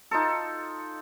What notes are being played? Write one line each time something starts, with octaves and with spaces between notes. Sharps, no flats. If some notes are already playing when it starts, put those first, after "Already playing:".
D#4 F4 A4